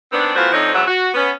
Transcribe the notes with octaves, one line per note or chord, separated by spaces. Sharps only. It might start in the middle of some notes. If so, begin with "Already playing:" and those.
D#3 B3 C4 D4
E3 A3 B3 F4 F#4 C5
F2 F3 C4 D4 D#4 C#5
E2 G#2 F#3 E5 F#5
F#4
B3 C#4